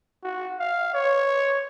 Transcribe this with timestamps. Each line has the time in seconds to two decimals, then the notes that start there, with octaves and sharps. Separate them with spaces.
0.24 F#4
0.60 F5
0.94 C#5